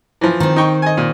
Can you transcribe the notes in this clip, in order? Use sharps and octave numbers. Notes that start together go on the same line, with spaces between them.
E3 F3
D#3 C4
D#4 G5 C#6
D#5 G#5
A#2